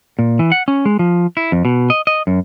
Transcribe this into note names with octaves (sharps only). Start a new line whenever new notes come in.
A#2
E3
F#5
C#4
G#3
F3
E4
F2
B2
D#5
D#5
F#2